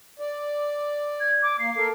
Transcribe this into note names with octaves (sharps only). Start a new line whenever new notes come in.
D5
G#6
D6
A#3 C7
A4 A#4